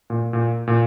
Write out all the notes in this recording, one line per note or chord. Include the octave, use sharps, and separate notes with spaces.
A#2
A#2
A#2